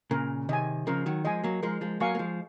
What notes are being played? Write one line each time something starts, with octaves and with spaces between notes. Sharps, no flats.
A#2 C#3 A#4
C3 D#3 D#5 G#5
C#3 F3 A#4
D#3 F#3
F3 G#3 D#5 G#5
F#3 A#3
F3 G#3 A#4
F3 G#3
F#3 A#3 F5 G#5 C#6
A#3
F3 G#3